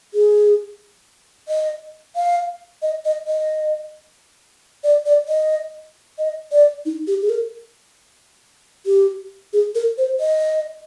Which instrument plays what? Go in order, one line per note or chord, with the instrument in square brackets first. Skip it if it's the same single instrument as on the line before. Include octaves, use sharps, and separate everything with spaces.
[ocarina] G#4
D#5
F5
D#5
D#5
D#5
D5
D5
D#5
D#5
D5
D#4
G4
G#4
A#4
G4
G#4
A#4
C5
D#5